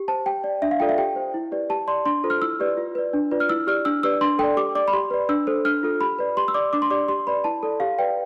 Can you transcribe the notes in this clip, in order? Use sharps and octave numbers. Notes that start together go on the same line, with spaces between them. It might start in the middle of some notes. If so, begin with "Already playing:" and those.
Already playing: G4
C5 A5
G4 G5
D5
D4 E5
F5
F4 A4 D5 G5
E5
G4 G5
C5
E4
G4 B4 D5
G4 A5
D5 C6
D4 C6
F4 A4 C5
F6
E4 E6
G4 B4 D5
F4
B4 D5
D4
F4 B4 D5
F6
E4 E6
G4 D5 F6
D4 E6
G4 B4 D5 E6
D4 C6
A4 D5 G5
G4 D6
D5 D6
B5
G4 C6
B4 D5
D4 E6
A4 C5
D4 F6
F4 A4
G4 B5
B4 D5
G4 C6
E6
D5 D6
D4 D6
C6
G4 D5 D6
G4 C6
B4 D5 B5
E4 A5
A4 D5
G4 F5
B4 D5 G5